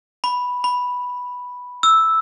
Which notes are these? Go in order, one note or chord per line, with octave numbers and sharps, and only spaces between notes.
B5
B5
E6